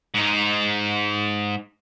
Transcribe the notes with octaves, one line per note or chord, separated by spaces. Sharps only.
G#2 D#4